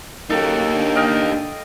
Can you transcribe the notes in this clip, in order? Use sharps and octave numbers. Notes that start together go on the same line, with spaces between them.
F#2 A#3 D#4 G4 A4
D3
D#5 F5 G5